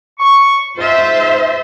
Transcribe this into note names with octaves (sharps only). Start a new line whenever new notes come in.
C#6
G#2 F4 C5 E5